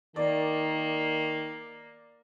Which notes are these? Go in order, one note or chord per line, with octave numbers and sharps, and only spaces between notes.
D#3 A#3 D5